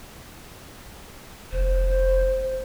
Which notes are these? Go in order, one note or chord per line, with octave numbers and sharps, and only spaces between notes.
F1 C5